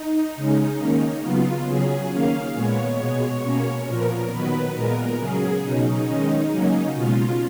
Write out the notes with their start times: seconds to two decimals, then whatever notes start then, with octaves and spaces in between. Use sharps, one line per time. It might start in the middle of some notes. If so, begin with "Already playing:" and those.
Already playing: D#4
0.36 C#3 G#3 C#4
0.80 D#3 A#3 C#4
1.23 C#3 F#3 B3 F4
1.67 C#3 F#3 C#4 G#4
2.11 D#3 A#3 C#4 F5
2.55 A#2 G#3 B3 C#5
3.00 B2 G#3 B3
3.43 B2 A#3 C#4
3.87 A#2 F3 B3 A#4
4.31 D#3 F#3 B3 B4
4.75 A#2 G#3 B3 A#4
5.19 C#3 F#3 C#4 G#4
5.63 B2 F#3 C#4 D#4
6.07 D#3 G#3 C#4 D#4
6.51 C#3 F#3 A#3 C#4
6.95 B2 G#3 C#4 F4